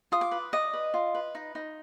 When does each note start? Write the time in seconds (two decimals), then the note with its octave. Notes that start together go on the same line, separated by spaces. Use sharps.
0.12 F4 D#6
0.21 D6
0.31 B4
0.53 D5 D#5
0.73 B4
0.94 F4
1.15 B4
1.35 D#4
1.55 D#4